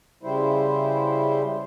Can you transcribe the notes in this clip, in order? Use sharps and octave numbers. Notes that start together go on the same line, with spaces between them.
C#3 G3 E4 C5